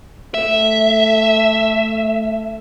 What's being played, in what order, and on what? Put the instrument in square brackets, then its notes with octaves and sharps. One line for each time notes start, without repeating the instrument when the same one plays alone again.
[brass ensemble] A3 [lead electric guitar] E5